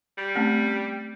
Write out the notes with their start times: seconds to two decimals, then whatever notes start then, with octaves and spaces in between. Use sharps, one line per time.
0.17 G3
0.35 A3 C4 C#4